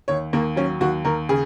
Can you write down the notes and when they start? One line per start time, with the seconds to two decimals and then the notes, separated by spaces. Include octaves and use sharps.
0.08 D#2 C#5
0.33 D#2 A#3
0.56 F#3 C#4
0.81 D#2 F#4
1.05 D#2 A#4
1.29 C#3 G#4